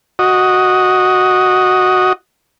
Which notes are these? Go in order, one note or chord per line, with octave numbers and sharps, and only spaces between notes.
F#4 D#5